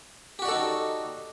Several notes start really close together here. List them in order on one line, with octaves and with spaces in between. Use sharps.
G4 F#4 D5 A4 D#4